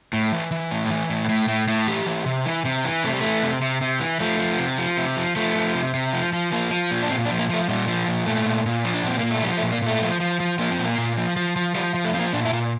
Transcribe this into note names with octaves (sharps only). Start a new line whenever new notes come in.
A2
E3
E3
A2
E3
A2
A2
A2
A2
E3 G4
E3
C3
E3
C3
E3
C3 A3
G3
E3 A3
C3
C3
C3
E3
F3 A3
F3
C3
F3
C3
F3
F3 A3
F3
C3
C3
F3
F3
F3 A#3
F3
A#2
D4
A#2 C4
D4
F3
A#3
F3 A3
A#2 G3
F3
A#2
A#2 A3
A#2
A#2
F3
D4
A#2 C4
A#2 A#3
A3
F3 G3
A3
A#2
A#3
A#2 A3
F3
F3
F3
F3 A#3
C4
A#2
A#3
A#2
F3
F3
F3
F3 G3
F3
A3
F3 C4
A#3
A#2 D4
E4
A#2 F4